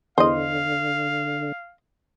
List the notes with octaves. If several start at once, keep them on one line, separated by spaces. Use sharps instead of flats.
E2 D3 C5 D#5 F5